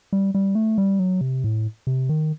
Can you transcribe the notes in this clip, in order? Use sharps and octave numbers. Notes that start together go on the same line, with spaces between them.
G3
G3
A3
G3
F#3
C3
A2
C3
D#3